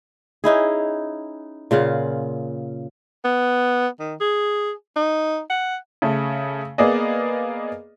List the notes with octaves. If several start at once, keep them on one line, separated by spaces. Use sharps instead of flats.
C#4 D#4 E4 G#4
A#2 C#3 F4 F#5
B3
D#3
G#4
D#4
F#5
C#3 A3
A#3 B3 G#4 D5 D#5